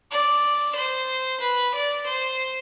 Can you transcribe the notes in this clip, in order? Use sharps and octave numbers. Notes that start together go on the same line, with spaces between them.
D5
C5
B4
D5
C5